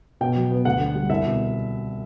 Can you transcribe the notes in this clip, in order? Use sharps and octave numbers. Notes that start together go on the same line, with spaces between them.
B2 G5
F#3
B3
D2 F#5
D3
G3
C2 E5
B2